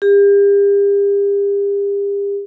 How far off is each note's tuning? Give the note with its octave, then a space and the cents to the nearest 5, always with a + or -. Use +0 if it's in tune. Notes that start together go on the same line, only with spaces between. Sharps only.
G4 +40